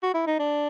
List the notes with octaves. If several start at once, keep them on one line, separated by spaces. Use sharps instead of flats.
F#4
E4
D#4
D4